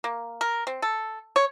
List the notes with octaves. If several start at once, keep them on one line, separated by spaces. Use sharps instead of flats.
A#3
A#4
C4
A4
C#5